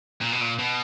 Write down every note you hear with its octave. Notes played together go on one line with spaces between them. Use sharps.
A#2
B2
A#2
B2